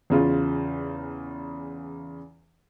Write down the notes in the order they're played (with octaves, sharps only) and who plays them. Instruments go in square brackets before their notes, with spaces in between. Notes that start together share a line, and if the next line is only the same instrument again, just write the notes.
[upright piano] E2 C#3 F4